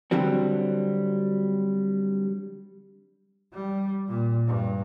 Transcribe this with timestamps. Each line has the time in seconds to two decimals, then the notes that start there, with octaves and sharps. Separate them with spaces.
0.11 D3 F#3 G3 C4
3.53 G3
4.08 A#2
4.47 G2